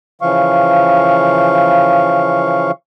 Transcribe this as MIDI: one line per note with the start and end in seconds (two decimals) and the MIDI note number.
0.21 2.71 49
0.21 2.71 52
0.21 2.71 53
0.21 2.71 77
0.21 2.71 85